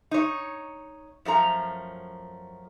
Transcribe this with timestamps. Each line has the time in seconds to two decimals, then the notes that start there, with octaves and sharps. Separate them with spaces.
0.11 D#4 C#5
1.25 F#2 F3 A3 A#5